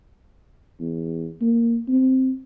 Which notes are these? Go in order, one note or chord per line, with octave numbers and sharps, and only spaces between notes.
E2
A#3
C4